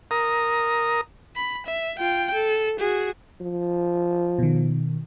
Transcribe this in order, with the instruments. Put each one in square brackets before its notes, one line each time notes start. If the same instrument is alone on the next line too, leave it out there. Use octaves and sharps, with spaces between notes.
[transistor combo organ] A#4 D#6
[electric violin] B5
E5
F4 G5
A4
F#4 G#4
[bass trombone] F3
[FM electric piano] B2 D#3